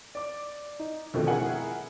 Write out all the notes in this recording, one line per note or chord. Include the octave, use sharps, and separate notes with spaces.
D5 D6
D#4
D#2 B2 D3 F3 A3 C4
E4 G#4 A#4 F#5 G#5